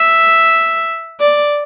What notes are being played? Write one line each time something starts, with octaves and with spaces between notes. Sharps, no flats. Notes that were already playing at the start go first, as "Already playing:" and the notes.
Already playing: E5
D5